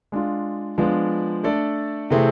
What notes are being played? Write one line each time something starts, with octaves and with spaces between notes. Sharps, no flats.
G#3 D4 F4
F3 G#3 B3 D4 F4
A3 D4 A4 D5
C3 E3 A3 C4 G#4